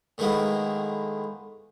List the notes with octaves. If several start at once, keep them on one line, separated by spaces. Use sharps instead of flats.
A2 D#3 G#3 A#3 B3